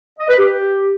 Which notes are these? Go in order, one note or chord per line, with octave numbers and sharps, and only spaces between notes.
D#5
B4
G4